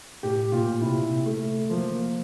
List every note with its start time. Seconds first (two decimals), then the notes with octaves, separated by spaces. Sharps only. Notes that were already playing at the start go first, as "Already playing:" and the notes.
0.23 A2 G4
0.52 A#2 F4
0.81 C3 E4
1.26 A3
1.70 F3 A#3
1.92 A#3